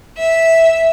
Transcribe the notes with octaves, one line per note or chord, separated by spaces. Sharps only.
E5